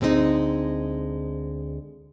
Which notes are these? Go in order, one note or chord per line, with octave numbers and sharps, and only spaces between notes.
D2 G#3 C4 C#4 D#4